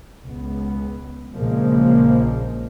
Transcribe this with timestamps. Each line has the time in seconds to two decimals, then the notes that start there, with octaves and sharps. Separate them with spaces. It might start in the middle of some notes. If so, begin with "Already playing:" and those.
0.26 C#2 B3
1.34 A#1 C#3 F3 G#3 A#3